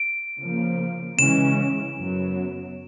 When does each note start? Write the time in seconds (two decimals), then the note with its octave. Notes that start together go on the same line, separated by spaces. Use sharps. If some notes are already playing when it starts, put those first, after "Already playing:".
Already playing: D7
0.39 C#3 F3 A#3
1.17 C#3 E3 G#3 C#4 E7
1.98 F#2 C#3 F#3 B3